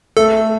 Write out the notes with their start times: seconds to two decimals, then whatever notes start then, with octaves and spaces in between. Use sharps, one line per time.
0.17 A3 A4